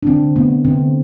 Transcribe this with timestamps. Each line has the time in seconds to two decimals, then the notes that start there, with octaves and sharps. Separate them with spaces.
0.03 D4
0.07 D3 C4
0.36 A3 B3
0.65 D3 C4